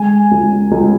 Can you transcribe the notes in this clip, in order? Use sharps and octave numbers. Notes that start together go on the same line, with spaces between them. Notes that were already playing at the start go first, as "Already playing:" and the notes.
Already playing: G#3 G#5
C#2
C#2